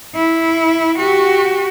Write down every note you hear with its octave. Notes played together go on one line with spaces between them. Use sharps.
E4
F#4 G4